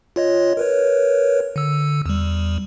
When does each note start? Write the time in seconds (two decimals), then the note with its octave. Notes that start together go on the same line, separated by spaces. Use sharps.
0.16 F4 C#5 D#5
0.57 A#4 B4 C#5
1.56 D3 E6
2.06 E2 G3